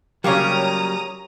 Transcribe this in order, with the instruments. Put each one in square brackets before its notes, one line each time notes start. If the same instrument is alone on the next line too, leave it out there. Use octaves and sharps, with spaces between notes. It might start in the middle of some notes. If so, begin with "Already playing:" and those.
[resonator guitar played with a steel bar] C#3 G3 A#3 [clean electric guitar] F#3 [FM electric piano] G4 C#5 [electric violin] A#5 D#6